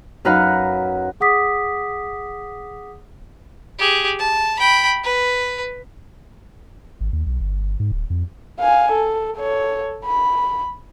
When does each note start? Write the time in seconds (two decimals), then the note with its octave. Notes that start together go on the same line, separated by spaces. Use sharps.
0.25 F#2 D#4 B4 F5 F#5
1.20 G#4 F#5 D6 D#6 B6
3.79 G4 G#4
4.19 A5
4.59 G5 B5
5.04 B4
7.01 G#1
7.13 D#2
7.26 B1
7.40 G1
7.61 G1
7.80 G#2
7.92 D1
8.10 F2
8.59 F5 G#5
8.92 A4
9.37 A4 C#5
10.05 B5